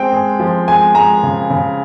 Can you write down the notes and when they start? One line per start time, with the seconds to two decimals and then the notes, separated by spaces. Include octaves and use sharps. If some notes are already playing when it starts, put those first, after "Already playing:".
Already playing: G#3 C4 G5
0.13 G#3
0.40 F3
0.68 G#3 G#5
0.95 G#3 A#5
1.23 C#3
1.50 C#3